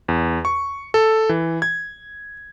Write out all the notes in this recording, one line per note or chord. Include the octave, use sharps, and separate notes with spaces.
E2
C#6
A4
E3
G#6